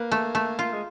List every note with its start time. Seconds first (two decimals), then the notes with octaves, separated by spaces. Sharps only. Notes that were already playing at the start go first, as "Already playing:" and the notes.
Already playing: A#3 B4
0.11 A3
0.35 A3
0.59 F4
0.73 G#3